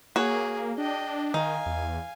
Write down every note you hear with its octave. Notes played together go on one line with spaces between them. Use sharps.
A#3 F#4 G#4 C#5
D4 D#5 G5
D#3 D#4 F5 G#5
E2